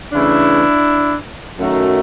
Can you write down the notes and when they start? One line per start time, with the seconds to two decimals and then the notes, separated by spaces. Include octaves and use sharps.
0.12 C#3 E3 A3 D4 E4
1.59 F#2 D#3 F#3 A3